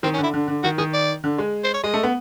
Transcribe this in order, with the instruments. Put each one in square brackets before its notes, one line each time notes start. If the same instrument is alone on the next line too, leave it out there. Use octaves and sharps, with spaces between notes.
[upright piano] D#3 [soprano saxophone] C4
[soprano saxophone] C#4
[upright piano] D3
[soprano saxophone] E4
[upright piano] D3
D3
[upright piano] D#3 [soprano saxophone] F#4
[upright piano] D#3 [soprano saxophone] G#4
[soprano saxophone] D5
[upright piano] D3
G#3
[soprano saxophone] C5
C#5
[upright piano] G#3 [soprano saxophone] D#5
[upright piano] A3
B3